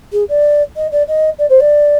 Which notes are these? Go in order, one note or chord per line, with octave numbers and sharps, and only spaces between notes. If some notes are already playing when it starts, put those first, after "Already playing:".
G#4
D5
D#5
D5
D#5
D5
C5
D5